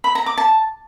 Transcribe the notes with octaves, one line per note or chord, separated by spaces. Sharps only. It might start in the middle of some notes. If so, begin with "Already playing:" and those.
B5
A#5
D6
A5